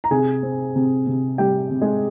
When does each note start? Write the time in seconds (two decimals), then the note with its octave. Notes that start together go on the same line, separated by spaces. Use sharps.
0.04 A#5
0.11 C3 G#4 G#5
0.43 C4
0.76 C3
1.07 C3
1.38 G3 G4 G5
1.71 C3
1.81 G#3 G#4